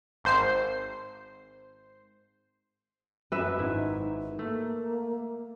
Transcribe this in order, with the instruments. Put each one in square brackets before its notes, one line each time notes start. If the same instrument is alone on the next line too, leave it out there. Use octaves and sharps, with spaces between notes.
[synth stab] G#1 C5 C7
[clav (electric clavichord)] F#2 [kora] B4 E5
[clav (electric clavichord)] G#1 E4 [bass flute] D#4
[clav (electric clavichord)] A3 [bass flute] A#3